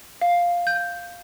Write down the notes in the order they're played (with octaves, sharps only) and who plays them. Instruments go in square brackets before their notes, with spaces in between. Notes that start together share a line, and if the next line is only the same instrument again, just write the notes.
[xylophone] F5
G6